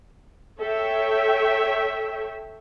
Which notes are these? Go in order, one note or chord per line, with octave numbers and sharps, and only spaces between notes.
A4 C#5 E5 G5